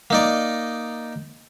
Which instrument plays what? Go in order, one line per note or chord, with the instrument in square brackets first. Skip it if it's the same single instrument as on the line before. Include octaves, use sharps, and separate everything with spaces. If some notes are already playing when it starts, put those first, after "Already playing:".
[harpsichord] A#3 D#4 D5